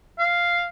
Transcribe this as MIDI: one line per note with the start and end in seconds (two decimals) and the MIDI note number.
0.18 0.66 77